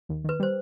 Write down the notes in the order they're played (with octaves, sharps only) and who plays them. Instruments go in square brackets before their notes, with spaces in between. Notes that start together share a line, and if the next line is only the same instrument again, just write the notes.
[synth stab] D#2
[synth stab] D#3 [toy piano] B4
[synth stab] G3 [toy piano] C5